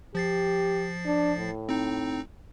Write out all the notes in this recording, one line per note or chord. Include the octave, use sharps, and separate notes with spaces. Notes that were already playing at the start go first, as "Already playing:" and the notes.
F3 G4 A6 C7
D4
A2
C4 D#4